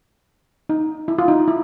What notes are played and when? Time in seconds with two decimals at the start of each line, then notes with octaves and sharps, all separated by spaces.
0.69 D#4
1.08 E4
1.18 F4
1.28 D#4
1.48 E4